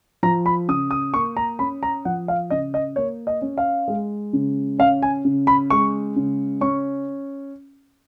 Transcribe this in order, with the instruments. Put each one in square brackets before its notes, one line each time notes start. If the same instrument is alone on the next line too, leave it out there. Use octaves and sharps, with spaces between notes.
[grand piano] F3 A#5
B5
C#3 D#6
D#6
A#3 C#6
A#5
C#4 B5
A#5
F3 F#5
F5
C#3 D#5
D#5
A#3 C#5
D#5
C#4
F5
G#3
C#3
C#4 F5
G#5
C#3
B5
G#3 C#6
C#3
C#4 C#6